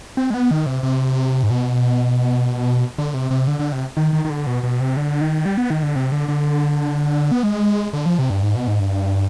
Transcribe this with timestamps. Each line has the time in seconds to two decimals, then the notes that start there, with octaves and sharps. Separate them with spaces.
0.17 C4
0.30 G#3
0.34 B3
0.51 D#3
0.66 C3
0.83 C3
1.43 G#2
1.50 B2
2.98 D3
3.14 C3
3.31 C3
3.47 D3
3.59 D3
3.72 C3
3.97 D#3
4.13 D#3
4.25 D#3
4.30 D3
4.47 B2
4.63 B2
4.80 C3
4.97 D3
5.21 D#3
5.45 G3
5.57 B3
5.70 D#3
5.83 D3
5.96 C3
6.12 D3
6.29 D3
7.32 B3
7.43 G#3
7.93 D3
8.06 F3
8.19 C3
8.30 G2
8.43 G#2
8.55 B2
8.67 G#2
8.80 G2